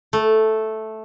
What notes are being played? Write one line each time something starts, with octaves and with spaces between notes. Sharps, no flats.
A3